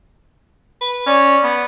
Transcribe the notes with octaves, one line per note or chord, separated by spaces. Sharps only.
B4
C#4 D5
B3